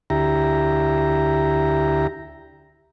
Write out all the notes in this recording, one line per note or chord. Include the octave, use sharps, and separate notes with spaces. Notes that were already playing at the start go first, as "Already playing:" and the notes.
D2 E4 G4 A#5